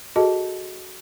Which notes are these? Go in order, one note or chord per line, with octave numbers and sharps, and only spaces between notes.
F#4 G#4 A4 D#5 A5